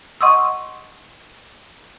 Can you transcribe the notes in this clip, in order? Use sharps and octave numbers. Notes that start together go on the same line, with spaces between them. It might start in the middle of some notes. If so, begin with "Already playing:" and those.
D#5 F#5 C6 C#6 D#6 E6